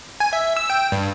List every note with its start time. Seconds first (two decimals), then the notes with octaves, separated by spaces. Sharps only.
0.20 G#5
0.33 E5
0.57 E6
0.70 G5
0.92 G2